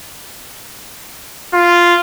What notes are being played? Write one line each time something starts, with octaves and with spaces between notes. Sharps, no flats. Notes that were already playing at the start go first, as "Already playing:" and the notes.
F4